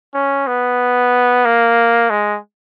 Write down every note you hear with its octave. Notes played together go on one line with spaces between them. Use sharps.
C#4
B3
A#3
G#3